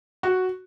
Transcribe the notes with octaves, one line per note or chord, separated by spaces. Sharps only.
F#4